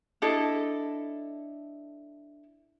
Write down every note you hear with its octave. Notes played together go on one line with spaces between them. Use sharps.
D4 E4 A4 D#5